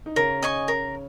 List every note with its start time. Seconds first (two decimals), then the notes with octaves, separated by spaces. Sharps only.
0.06 D#4
0.16 C#3 C#4 A#4
0.43 D#5 G#5 C#6
0.68 A#4